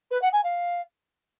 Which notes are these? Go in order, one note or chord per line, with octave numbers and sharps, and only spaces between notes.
B4
F#5
G#5
F5